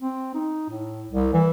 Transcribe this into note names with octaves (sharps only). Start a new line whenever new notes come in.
C4
D#4
A2
C2
E3